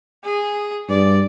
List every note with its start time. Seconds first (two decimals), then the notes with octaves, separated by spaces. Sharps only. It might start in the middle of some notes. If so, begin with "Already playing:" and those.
0.24 G#4
0.89 G2 D5